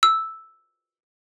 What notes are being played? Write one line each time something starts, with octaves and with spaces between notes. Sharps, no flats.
E6